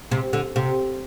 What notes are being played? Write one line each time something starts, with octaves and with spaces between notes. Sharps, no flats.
C3
D3
C3